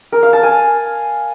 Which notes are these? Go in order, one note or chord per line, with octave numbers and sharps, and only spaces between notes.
A#4
F5
A5
G#5